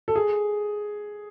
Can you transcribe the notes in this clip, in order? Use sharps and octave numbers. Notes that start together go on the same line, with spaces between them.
A4
G#4